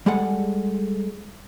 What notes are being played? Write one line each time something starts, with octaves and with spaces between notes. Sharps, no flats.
G3 G#3 G#4 A4 F#5